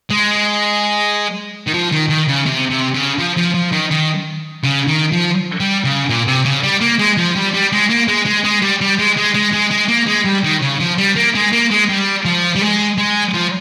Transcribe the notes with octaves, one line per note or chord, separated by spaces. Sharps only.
G#3
D#3
F3
D#3
D#3
C#3
C3
C3
C#3
F3
F3
F3
D#3
D#3
C#3
D#3
F3
G3
C#3
A#2
C3
C#3
G3
A#3
G#3
F3
G3
G3
G#3
A#3
G#3
G#3
G#3
G3
G3
G#3
G#3
G#3
G#3
G#3
A#3
G#3
G3
D#3
C#3
F3
G3
A#3
G#3
A#3
G#3
G3
F3
G3
G#3
G#3
F3